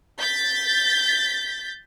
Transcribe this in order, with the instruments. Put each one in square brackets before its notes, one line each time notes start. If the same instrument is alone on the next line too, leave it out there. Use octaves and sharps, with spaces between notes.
[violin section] G6 A6 B6